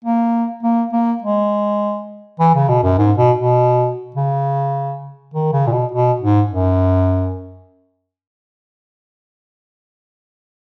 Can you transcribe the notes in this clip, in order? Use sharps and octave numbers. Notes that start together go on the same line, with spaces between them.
A#3
A#3
A#3
G#3
E3
C#3
B2
F#2
G#2
B2
B2
C#3
D#3
C#3
A#2
B2
B2
G#2
F#2